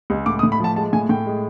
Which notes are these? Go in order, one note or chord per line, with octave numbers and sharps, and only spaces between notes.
C#2
A2 D6
D#6
A2
B5
F3 A5
G#3 A5
A2 G#5
A2 G5
G#3